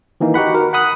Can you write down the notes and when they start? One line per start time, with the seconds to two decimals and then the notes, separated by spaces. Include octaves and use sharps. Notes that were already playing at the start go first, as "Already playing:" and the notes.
0.21 D#3 E3 A#3 D#4
0.34 D#4 F#4 G4 F#5 B5
0.55 A#4
0.73 F#5 B5 D#6 F#6